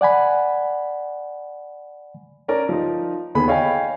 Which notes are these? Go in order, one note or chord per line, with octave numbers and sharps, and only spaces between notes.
D5 F#5 G#5 B5
C#4 A#4 D5
F3 D#4
D#2 B3 G#4 B5
C#5 D#5 F5 G5 G#5